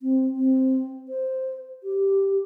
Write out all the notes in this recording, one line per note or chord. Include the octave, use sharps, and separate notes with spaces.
C4
C4
C5
G4